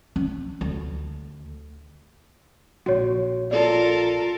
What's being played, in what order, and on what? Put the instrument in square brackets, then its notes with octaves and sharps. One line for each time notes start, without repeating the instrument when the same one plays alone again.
[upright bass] C#4
D2
[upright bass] A#1 [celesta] F#4 C#5
[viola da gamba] F4 A4 A#4 [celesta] D5